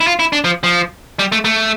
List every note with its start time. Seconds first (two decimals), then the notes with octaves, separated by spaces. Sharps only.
0.01 E4
0.07 F4
0.19 E4
0.33 D4
0.44 F3
0.63 F3
1.19 G3
1.32 A3
1.45 A3